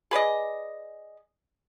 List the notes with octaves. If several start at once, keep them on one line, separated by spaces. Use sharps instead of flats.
G#4 B4 D5 D#5